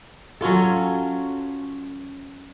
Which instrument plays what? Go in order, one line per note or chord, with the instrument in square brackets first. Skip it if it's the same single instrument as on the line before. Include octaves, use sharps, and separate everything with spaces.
[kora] F#3 C#4 F4 A4